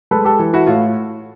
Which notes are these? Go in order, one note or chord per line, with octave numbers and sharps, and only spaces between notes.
G#3 A4 B4
G4 A4
E3
E4 F#4
A2 F4